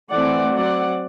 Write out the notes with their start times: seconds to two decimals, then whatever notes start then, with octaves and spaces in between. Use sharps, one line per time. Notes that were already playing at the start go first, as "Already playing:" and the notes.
0.11 E3 A3 C4 D5 F#5
0.54 F#3 C4 D5 F#5